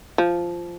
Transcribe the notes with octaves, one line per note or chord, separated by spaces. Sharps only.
F3